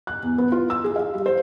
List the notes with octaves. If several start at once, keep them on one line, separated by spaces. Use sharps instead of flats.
F#6
E2
B3
F4
E6
G#4
F5
G3
C5